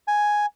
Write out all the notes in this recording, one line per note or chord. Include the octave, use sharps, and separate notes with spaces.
G#5